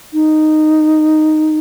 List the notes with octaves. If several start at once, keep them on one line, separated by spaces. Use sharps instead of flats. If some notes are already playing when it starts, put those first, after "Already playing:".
D#4